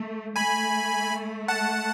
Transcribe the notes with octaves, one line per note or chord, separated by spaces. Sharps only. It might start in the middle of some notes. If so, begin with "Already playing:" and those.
Already playing: A3
A3 G#5 B5
F#5 A5